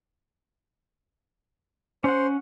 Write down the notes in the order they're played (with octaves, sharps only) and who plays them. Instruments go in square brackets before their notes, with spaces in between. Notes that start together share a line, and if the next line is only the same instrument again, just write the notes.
[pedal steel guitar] C#4 F#5 [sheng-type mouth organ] C5